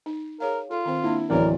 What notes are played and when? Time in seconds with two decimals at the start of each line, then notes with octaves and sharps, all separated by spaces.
0.06 D#4
0.40 G#4 A#4 C#5 F5
0.71 F4 A4
0.85 D#3 C4 C5
1.04 A#3 D4 E4
1.30 D1 E3 B3 G#4 A#4 C#5 D5